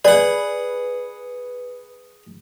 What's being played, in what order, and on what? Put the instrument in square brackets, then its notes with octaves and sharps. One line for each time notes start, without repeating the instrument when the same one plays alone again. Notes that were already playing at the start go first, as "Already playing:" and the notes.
[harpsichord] G#4 F#5 [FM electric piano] B4 [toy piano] D5